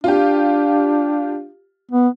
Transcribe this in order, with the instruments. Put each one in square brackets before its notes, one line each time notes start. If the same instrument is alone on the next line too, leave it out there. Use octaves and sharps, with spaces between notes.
[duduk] D4 [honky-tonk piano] F4 G4
[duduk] B3